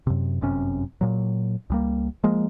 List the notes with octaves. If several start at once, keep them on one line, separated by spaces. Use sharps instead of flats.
F#2 C3
G1 F#2 C3 C#4
A#2 F#3
C#2 G3 A#3
F3 G#3 A#3